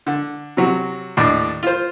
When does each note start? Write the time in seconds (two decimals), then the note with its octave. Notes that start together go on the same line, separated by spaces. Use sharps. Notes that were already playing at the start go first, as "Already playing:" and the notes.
0.06 D3
0.57 C3 F#3
1.17 D#2 A2 D4
1.63 F4 C5